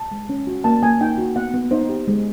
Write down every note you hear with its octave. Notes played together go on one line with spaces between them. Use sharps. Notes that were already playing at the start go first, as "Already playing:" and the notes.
Already playing: A5
G#3
C#4
F#4
A#3 A5
A#3 G#5
D#4 G5
F#4
B3 F#5
B3
D#4 C5
G4
G#3